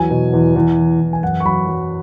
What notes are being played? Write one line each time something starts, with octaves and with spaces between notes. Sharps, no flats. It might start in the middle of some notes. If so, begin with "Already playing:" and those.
Already playing: E2 F#3 G#5
B2
E2
E2
E3
E2
G#5
F#2 F#5
C#6
F#3 B5
F#3